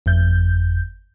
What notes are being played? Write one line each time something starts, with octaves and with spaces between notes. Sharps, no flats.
G1 F2 G6